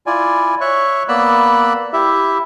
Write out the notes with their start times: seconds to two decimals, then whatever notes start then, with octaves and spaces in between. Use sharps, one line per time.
0.06 E4 F4 D5 G#5
0.61 C#5 E5 C#6 F#6
1.08 A#3 B3 D5 B5 E6 F#6
1.93 E4 G4 E5